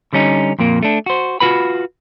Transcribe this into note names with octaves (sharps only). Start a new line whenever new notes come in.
D3 G3 C#4 D#4
F2 A#2 A#3
A3 D4
F#4 C5
F4 F#4 B4 B5